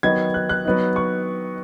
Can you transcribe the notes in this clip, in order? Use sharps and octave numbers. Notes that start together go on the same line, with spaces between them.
D#3 F#3 B3 D#4 G#6
F#6
F#6
F#3 B3 D#4
C#6